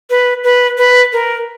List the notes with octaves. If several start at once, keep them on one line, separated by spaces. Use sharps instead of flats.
B4
B4
B4
A#4